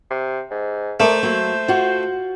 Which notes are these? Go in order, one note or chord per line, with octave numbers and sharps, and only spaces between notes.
C3
G#2
A3 A#4 C5 D5
F#3 A#3
F4 F#4